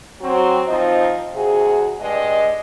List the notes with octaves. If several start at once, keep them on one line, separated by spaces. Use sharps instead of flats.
F#3 C4 F#4
F3 C4 D#4 D#5
D2 C3 F#4 G#4
G2 G#3 D5 D#5